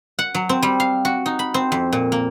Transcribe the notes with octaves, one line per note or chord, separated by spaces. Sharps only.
F#5
F#3
C4
G3
F5
F#4
D#4
B5
C4
F2
A#2
A#3